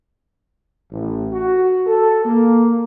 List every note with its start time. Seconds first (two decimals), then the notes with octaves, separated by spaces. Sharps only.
0.92 A1
1.32 F#4
1.87 A4
2.25 A#3